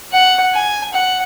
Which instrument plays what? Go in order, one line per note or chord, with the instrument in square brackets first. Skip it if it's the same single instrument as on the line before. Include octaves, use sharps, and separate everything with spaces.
[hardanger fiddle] F#5
G#5
F#5